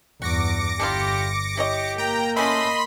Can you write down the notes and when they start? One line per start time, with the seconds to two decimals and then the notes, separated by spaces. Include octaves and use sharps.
0.22 E2 G2 F#4 D6 A#6 C#7
0.80 G1 D4 E4 F4 G4
1.57 E4 G4 C#5 D#5
1.98 A#3 G5 A#5
2.36 A3 C#4 E4 D#5 B5 C6 B6